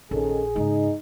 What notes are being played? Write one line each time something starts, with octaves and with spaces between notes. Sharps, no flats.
A#1 D#3 C#4 G#4 A4
G#2 C#3 D#4